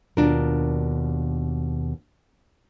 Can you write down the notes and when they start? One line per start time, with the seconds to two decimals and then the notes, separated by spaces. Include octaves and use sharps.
0.17 D#2 B2 D4 F4 A#4